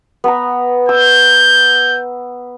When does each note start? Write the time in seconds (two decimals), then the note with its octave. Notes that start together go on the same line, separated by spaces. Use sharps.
0.24 B3 B4 A#5
0.89 E6 G6